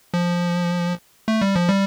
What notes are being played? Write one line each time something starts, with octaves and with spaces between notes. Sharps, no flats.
F3
A3
G3
F3
G3